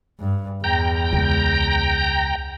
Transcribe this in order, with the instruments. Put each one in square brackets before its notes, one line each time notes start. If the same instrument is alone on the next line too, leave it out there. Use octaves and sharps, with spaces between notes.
[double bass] G2
[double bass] E2 [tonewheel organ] G5 A#5
[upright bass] C#2